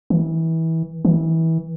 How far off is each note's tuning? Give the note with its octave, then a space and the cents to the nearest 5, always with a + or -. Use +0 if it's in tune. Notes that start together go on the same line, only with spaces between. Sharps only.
E3 -25
E3 -25